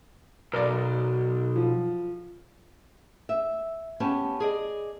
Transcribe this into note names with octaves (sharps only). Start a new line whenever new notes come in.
B1 A#4 D5
F3
E5
B3 C#4 G4 G#5 A5
G#4 D5 D#5